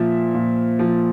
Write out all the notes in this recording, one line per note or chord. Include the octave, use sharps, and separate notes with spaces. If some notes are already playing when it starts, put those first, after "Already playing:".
Already playing: A#2 F3 E5
A#2
F3